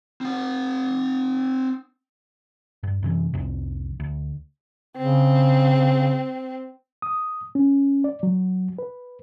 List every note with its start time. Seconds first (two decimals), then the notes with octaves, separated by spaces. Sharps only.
0.21 C4 F#5
2.83 G2
3.03 F#2 C3 E3
3.34 C2 F2 C3
4.00 D2
4.97 C#3 C4
7.02 D#6
7.55 C#4
8.04 D5
8.23 F#3
8.78 B4